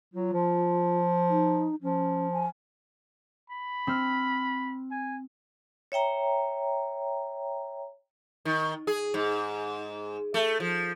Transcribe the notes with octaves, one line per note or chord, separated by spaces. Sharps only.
F#3 F4
F3
D#4
F3 C#4
G#5
B5
C4 F6
G#5
C#5 E5 G5 A#5
D#3
G#4
G#2
A3
F3